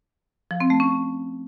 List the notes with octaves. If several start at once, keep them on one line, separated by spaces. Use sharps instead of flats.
F3
C4
A3
C#4